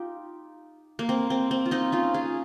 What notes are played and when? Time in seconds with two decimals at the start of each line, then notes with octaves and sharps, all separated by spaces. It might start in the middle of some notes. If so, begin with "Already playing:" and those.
Already playing: D#4 F4 G4
0.99 A#3
1.09 C4
1.30 C4
1.51 C4
1.66 F4
1.71 C4 D#4
1.92 C#4 F4
2.14 F4 G#4